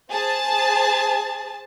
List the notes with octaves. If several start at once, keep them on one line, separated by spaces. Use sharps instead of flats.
G#4 C5 A5 A6